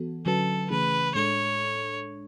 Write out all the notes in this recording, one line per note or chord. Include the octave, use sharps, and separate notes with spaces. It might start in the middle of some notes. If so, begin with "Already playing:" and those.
Already playing: E3 B3 F#4 A4
D3 F#3 C#4 F#4 A4 B4
C#3 E3 A3 C#4 G#4 B4
A2 G#3 D4 A4 C#5